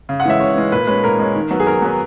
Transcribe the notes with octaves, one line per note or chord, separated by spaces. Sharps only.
C#3
F#5
E3 G#3 C#4 E5
C#3 C#5
E3 G#3 C#4
A#2 B4
G#3 C#4 B4
A#2 A#4
G#3 C#4
D#3
F#3 B3
G#4
D#3 A#4
F#3 B3